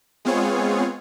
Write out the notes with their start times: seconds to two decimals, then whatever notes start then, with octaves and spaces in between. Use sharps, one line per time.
0.25 G#3 B3 C4 F4 G#4 C#5